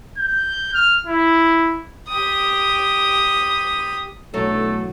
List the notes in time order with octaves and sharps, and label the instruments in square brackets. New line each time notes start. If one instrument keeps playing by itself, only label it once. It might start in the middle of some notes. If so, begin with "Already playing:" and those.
[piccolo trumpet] G6
F6
E4
[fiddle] G4 D#6
[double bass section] B1 D3 E3 [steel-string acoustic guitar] F#3 [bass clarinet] A3 [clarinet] A4